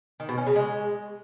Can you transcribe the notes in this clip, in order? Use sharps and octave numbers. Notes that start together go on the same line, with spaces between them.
D#3
B2
C#4
C#3
G#3